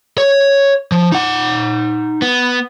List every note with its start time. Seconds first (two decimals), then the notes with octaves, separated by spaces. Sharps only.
0.18 C#5
0.92 F3
1.12 D#4 F#5
2.22 B3